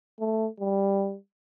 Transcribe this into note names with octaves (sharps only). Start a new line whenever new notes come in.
A3
G3